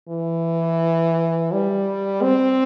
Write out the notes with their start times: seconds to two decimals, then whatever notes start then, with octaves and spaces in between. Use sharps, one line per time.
0.09 E3
1.52 G3
2.22 C4